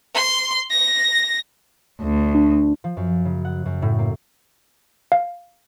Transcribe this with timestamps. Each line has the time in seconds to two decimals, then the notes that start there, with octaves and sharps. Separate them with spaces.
0.15 C6
0.71 A#6
2.02 D2
2.35 D4
2.84 F3
2.97 F#2
3.25 C#3
3.45 F#5
3.66 F#2
3.82 A2
3.99 A#3
5.12 F5